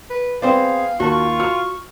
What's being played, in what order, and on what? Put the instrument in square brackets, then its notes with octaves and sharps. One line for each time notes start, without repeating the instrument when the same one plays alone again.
[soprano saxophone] B4
[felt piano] B3 G5 [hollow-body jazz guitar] C4 C5 D5 [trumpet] G#4 [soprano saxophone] F5
[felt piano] D#2 A5 [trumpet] F4 [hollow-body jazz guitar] F#4 [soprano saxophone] C#6
[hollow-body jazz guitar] F#4 [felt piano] F6